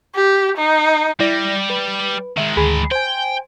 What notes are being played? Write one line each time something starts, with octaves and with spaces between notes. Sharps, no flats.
G4
D#4
G3 E4 D5 A#6
B4
D#3 G#3 E5
D2 G#4 B5
C5 G5 G#5